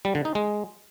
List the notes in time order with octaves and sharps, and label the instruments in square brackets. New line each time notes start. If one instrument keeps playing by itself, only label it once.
[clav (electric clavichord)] G3
D3
D#4
G#3